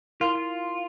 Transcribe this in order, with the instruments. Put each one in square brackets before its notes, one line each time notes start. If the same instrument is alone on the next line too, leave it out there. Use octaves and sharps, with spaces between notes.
[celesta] E4 A#4 F5 C6 [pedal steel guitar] F4
[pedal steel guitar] F4